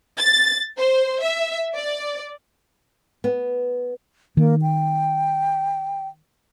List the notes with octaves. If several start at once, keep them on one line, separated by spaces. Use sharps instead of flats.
A6
C5
E5
D5
B3
D#3 A#3
G5